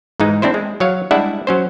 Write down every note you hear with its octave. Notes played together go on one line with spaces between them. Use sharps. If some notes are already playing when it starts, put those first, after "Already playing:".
G#2 E3 G#3 D#4
C4 D4 E4 C5
G#3
F#3 C#5 F5
G3 G#3 D4 E4 E5 F#5
F#3 C#4 C5